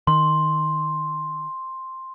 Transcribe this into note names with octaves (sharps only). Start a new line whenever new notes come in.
D#3 C6